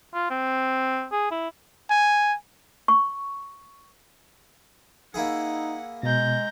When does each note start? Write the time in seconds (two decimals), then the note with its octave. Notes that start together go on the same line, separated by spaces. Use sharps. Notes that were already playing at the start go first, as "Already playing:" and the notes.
0.14 F4
0.30 C4
1.11 G#4
1.31 E4
1.90 G#5
2.88 C#6
5.14 A#3 D#4 E4 G#4 F#5
6.03 B2 G#3 A#5 G6